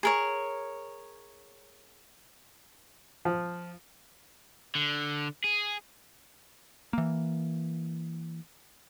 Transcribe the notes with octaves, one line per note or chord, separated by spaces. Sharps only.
G#4 A#4 C#5
F3
D3
G#4
E3 A#3